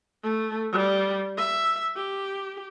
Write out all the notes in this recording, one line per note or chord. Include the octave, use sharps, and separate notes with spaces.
A3
G3
E5
G4